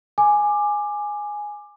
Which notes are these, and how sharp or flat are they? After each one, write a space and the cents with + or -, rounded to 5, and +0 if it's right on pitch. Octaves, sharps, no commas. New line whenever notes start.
G#5 +0 D6 +15